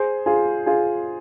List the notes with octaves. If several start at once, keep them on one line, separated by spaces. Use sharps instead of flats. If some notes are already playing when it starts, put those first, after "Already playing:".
Already playing: G#4 C5
F4 G#4
F4 G#4